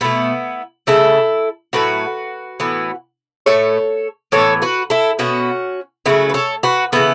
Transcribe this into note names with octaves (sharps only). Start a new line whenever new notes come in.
B2 A3 B3 E4
C#3 A3 E4 A4
A2 F#3 A3 F#4 B4
A2 E3 B3
A2 A3 A4 C#5
A2 E3 B3 A4 C#5
F#4 B4
E4 A4
B2 B3 C#4 F#4
C#3 F#3 A3 B3 E4
B4
A4 C#5
F#4 B4
C#3 E3 A3 B3 E4